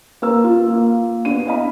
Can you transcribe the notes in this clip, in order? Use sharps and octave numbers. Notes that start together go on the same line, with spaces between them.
A#3 A#4 E6
F4
A#3
B3 D4 D#7
E4 D#5 F5 B5